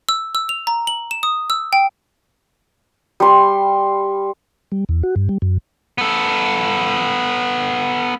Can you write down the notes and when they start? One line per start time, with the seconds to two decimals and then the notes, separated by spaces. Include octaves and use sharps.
0.09 E6
0.35 E6
0.49 F7
0.67 A#5
0.87 F#7
1.11 E7
1.23 D#6
1.50 E6
1.73 G5
3.20 G3 C6
4.72 G3
4.89 E2
5.03 F#4
5.16 G2
5.29 G3
5.42 F#2
5.98 B3 A4